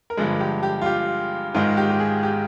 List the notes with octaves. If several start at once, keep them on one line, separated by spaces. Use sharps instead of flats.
A#4
G2 D3 F3 G#3 G#4
G4
G4
F4
G4
G#2 D#3 G#3 F4
G4
G4
G#4
G4